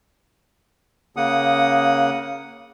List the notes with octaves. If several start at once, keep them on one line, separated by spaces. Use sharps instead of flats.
C#3 A#3 F#5 D#6